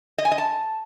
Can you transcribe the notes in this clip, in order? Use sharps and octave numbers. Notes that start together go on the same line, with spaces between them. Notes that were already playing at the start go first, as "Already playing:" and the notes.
D#5
G#5
D#5
A5